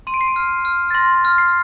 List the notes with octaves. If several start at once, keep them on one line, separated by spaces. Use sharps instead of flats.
C6 D#7
D7
C7
D7
F6
F6
A6
C6 A#6
F6
C7